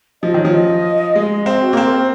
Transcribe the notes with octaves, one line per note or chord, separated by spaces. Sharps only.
F3 D#5
D#3 C#5
F3
D#5
G#3
C4
F#4
A#3 C4 G#4
A#4
C5